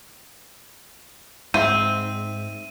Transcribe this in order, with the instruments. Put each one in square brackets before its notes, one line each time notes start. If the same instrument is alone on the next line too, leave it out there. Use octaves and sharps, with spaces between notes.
[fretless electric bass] G#2 [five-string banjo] C4 [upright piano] E5 [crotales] D#7